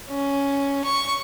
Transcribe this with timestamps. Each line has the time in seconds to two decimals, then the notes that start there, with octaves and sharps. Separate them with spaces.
0.10 C#4
0.85 C#6